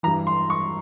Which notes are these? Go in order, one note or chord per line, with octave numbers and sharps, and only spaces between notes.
G2 E3 A#5
C6
C#6